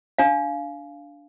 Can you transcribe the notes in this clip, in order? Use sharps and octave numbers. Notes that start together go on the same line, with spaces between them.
D4 F5